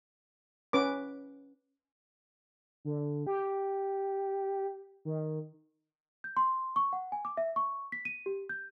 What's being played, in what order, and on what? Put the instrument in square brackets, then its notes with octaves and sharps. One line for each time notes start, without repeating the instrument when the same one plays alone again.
[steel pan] C#4 B4 D6
[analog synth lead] D3
G4
D#3
[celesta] G6
C6
C#6
F#5
G#5
D6
E5
C#6
B6
D#7
G4
G6